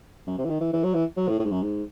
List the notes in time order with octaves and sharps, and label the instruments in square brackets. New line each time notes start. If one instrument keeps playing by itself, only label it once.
[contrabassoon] F#2
C3
E3
D#3
E3
E3
F#3
E3
F#3
A2
A2
G#2
F#2
G#2